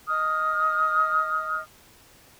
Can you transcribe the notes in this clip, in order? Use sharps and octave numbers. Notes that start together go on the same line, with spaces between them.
D#5 D#6 F6